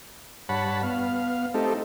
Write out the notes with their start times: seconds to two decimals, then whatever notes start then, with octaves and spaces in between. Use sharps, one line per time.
0.49 G2 C#5 F#5 A5 B5
0.83 B3 F5
1.54 A3 C4 D#4 G4 A4